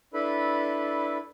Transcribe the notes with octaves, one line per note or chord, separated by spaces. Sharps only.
D4 E4 A4 B4 B5